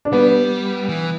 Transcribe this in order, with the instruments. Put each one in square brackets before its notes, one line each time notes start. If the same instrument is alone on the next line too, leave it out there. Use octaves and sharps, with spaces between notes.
[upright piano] D4
[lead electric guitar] G3 [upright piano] B3
[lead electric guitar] E3